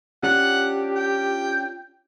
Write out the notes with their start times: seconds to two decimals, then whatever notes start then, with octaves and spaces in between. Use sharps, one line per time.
0.23 C#4 D4 F4 G4 F#5
0.96 G5